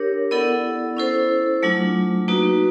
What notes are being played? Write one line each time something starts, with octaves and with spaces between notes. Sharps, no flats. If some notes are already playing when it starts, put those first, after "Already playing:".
Already playing: D4 G4 A#4 C#5
B3 E4 A4 D5 F#5
C#4 E4 A4 C5
F#3 A3 D4 F4
A#3 D#4 F#4 B4